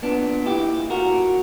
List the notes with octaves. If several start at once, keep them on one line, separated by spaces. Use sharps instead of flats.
A#2 B3 D4
A#2
A#2 E4 G4
A#2
A#2 F#4 A#4
A#2